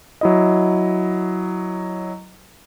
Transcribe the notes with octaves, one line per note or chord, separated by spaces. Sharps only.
F#3 E4 D#5